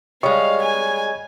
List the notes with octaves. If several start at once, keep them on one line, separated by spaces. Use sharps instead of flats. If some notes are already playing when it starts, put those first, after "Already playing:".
G3 G#3 C#5 D#5 F5 C#6
G#5